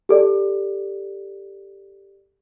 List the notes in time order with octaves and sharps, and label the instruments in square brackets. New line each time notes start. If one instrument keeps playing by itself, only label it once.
[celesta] G4 A4 D5